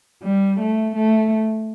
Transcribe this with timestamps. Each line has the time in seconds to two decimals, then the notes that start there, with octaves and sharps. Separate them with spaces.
0.23 G3
0.60 A3
0.95 A3